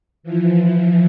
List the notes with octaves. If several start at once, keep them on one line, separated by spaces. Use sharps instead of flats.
E3 F3